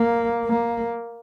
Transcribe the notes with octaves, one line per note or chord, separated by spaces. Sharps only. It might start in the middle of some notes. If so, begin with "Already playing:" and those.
Already playing: A#3
A#3